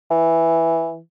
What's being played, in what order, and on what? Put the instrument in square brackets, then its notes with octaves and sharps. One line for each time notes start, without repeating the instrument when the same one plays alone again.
[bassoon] E3